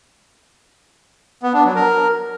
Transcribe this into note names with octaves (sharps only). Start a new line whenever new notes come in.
B3
D4
F#3
A#4